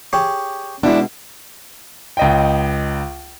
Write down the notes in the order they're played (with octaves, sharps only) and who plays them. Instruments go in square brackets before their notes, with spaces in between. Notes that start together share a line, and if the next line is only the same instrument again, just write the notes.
[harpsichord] G4 G#4 C#5
[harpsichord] B2 G#3 [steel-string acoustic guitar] D4 E4
[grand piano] C#2 D#5 G5